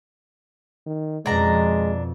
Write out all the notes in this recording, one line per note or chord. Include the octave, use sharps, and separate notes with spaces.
D#3
F2 B2 G#3 D4 A#5